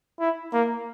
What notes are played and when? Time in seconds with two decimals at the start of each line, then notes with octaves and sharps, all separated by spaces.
0.20 E4
0.53 A#3